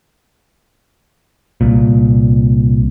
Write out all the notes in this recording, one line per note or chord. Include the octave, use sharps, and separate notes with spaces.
C2 A#2